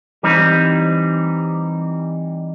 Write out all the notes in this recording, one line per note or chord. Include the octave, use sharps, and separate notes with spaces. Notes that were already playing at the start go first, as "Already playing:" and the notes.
E3 G3 C4 D#4